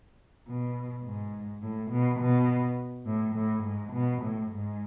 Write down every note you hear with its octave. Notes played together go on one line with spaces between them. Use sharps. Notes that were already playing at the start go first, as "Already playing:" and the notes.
B2
G#2
A2
B2
B2
A2
A2
G#2
B2
A2
G#2